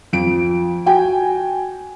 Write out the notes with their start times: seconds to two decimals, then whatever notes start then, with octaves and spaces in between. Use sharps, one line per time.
0.13 F2 D7
0.86 F#4 G5 G#5